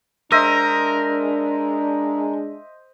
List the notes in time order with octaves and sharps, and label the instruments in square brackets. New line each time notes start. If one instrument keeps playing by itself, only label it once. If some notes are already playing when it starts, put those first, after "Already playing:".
[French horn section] G#3 D4 [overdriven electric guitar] A#4 [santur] C5 D#5 E5